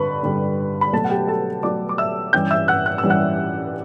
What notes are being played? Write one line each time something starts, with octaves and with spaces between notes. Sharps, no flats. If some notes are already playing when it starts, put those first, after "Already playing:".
Already playing: G2 D3 G3 B4 B5 C#6
G2 D3 G3
B5
B2 F#3 A3 A4 A5
F#5
G4 G5
A4 A5
B2 F#3 A3 D5 D6
D6
E5 E6
G2 E3 G3 C#4 G5 G6
E5 E6
F#5 F#6
F#6
E6
G2 E3 G3 C#4
F#5 F#6